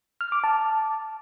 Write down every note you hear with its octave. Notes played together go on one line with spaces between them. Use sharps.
F6
D6
A5